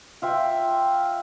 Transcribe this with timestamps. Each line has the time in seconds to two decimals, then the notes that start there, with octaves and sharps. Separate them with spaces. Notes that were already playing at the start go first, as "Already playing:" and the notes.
0.22 F4 E5 G5